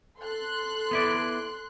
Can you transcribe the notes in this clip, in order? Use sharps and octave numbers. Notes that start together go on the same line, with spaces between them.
A4 C6 F#6
B3 E4 D5